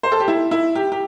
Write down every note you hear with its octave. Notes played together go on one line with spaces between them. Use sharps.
C5
A4
G4
E4
E4
G4
G4